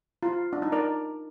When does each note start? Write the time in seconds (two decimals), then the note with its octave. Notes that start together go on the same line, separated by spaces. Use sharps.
0.23 F4
0.53 D4
0.62 D#4
0.72 A#4 D5